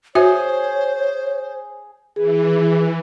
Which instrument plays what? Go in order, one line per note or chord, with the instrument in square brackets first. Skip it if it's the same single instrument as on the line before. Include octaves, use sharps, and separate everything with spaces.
[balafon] F#4 E5 [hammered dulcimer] G#4 [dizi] C5 [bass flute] C#5
[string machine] E3 [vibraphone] G#4